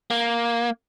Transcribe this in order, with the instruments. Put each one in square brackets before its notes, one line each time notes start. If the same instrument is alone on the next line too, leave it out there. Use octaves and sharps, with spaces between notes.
[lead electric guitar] A#3